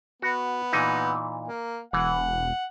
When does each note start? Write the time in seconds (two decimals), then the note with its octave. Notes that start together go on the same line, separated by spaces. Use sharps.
0.22 B3 F#4
0.73 A#2 E3 D#4
1.48 A#3
1.93 E1 E3 F#5